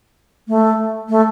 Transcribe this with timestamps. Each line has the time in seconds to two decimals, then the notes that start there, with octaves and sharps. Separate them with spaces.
0.48 A3
1.09 A3